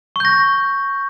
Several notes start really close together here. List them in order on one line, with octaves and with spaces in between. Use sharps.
C#6 G6 A#6